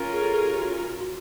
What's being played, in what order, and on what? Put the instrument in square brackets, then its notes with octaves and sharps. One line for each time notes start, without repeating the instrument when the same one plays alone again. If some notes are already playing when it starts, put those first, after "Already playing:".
Already playing: [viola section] C#4 F4 A#4
[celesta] G#4
A4
G#4
G4
F#4
F4
F#4